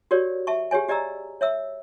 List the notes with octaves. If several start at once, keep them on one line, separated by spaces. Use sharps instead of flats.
F#4 G4 A#4 C#5 D5
E5 A5 C#6
G4 G#4 C#5 G#5
G4 D5 D#5 A#5 E6
C#5 E5 E6